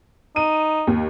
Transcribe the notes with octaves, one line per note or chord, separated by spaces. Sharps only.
D#4 D#7
D#2